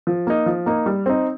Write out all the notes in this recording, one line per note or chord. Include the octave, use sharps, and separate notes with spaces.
F3
A#3 D#4
F3
A#3 D#4
G3
C4 D#4